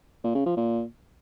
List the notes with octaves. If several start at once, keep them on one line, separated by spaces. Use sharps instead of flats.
A#2
C#3
F3
A#2